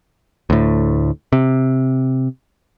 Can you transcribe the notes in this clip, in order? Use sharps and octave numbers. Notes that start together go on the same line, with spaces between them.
D2 A2
C3